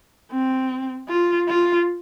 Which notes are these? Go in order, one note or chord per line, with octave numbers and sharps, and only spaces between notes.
C4
F4
F4